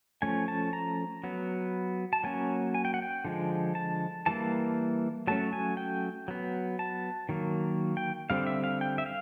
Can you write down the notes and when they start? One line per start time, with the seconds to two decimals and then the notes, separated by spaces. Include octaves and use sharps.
0.22 F3 A3 C#4 G#5
0.48 A5
0.73 A#5
1.24 F#3 B3
2.13 A5
2.24 F#3 A#3 C#4 G#5
2.74 G#5
2.85 G5
2.94 F#5
3.02 G5
3.25 D3 F3 G#3
3.75 A5
4.26 E3 G3 A#3 A5
5.27 F#3 A3 C#4 A5
5.53 G#5
5.77 G5
6.28 F#3 B3
6.79 A5
7.29 D#3 F#3 A#3
7.97 G5
8.30 D3 G3 C4 F5
8.47 E5
8.64 F5
8.81 G5
8.98 E5
9.06 F5